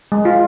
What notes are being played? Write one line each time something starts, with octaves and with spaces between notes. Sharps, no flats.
G#3
F4